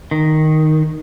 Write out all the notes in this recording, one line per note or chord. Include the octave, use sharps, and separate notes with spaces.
D#3